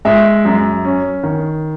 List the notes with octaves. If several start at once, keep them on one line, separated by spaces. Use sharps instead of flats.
G#3 E5
F#2
C#4
D#3